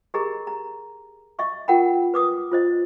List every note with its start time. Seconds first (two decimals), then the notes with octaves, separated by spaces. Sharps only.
0.14 G4 G#4 A#4 D#5 A#5
0.47 A#5
1.39 D#5 E5 C#6 D6
1.68 F4 A#4 F#5 G5 B5
2.14 B4 D6 D#6
2.52 F4 C5 D#5